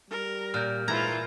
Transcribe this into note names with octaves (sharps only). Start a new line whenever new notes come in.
G3 A#4
A#2 F6 G6
G#2 E3 F4 A#5 G#6